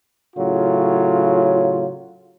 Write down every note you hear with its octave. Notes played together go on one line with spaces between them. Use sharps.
A2 C#3 F#3 F4